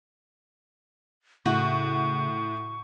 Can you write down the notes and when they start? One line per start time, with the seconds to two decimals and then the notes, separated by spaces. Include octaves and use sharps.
1.46 A2 C#3 F#4 C#6